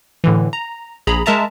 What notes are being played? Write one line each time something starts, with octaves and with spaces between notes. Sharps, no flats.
A2 D3 E3
A#5
A#1 G#4 A#5 B5
G#3 A#4 E5 A5 A#5